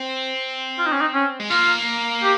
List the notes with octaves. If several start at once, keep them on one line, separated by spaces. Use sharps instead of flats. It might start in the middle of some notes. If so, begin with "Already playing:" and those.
Already playing: C4
F4
D#4
C#4
D#4
C#4
G#3
A#3 F4
G4